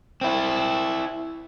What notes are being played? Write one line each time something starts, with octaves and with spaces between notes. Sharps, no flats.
C4 E4